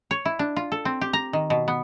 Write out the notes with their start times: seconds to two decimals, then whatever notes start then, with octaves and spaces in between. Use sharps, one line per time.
0.11 C#5
0.25 E4
0.39 D4
0.56 F4
0.72 A4
0.85 C4
1.01 G4
1.13 A#5
1.33 D#3
1.50 B2
1.68 B3